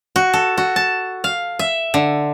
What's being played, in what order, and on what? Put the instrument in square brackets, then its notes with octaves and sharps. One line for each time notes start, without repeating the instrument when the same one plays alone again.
[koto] F#4
A4
F#4
A5
F5
E5
D3